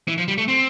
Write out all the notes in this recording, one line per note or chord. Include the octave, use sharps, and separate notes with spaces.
E3
F3
G3
A3
C4